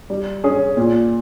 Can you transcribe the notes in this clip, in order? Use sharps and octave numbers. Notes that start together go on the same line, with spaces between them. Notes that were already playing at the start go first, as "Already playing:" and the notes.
G3
C#4 G#4
A#2